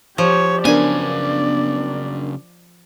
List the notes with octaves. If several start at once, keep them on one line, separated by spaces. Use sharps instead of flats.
F3 G4 C#5
C#3 F#3 B3 D4 A#4 D5 G#5